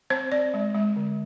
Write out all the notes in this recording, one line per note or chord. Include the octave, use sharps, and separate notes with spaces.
C4 C5
C4 D5
G#3
G#3
D3